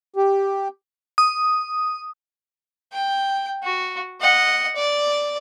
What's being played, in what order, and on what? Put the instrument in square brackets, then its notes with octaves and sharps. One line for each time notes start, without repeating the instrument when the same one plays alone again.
[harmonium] G4
[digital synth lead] D#6
[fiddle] G5
F#4
D#5 F#5
D5